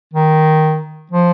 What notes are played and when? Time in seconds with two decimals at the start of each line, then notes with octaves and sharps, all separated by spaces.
0.13 D#3
1.11 F3